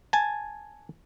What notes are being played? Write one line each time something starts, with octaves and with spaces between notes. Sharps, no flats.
G#5 A5